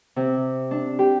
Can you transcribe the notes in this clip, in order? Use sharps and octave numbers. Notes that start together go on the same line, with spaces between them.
C3
D4
G4